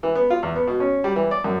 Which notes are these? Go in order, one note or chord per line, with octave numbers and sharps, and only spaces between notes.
E3
B3
F4
E2
B3
B2
C#4
G3
E3
D5
F#2